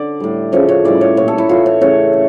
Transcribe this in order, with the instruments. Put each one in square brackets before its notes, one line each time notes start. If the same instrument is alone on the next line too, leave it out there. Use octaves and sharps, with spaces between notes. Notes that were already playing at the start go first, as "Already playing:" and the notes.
Already playing: [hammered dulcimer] D3 D5
A2 G3
C#3 F3 A3 C#5
C#5
A2 E3 G3 D5
C#5
A#2 G3 C#5
A4
E4
A2 E3 A3 F4
C#5
C#3 E3 A3 C#5
A3